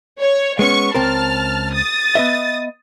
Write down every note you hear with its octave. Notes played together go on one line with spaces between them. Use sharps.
C#5
G#3 B3 C#4 C#6
C#2 C4 A#4 A5 F6
D#6 A6
B3 D#5 E5